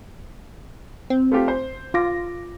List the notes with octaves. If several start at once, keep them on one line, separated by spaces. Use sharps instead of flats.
C4
A3 F4 G4
C5
F4 D6 A#6